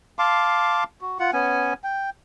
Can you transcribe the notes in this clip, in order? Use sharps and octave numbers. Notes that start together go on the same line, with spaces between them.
F5 A5 C6 D6
F#4
F4 F#5
B3 C#4 G#5
G5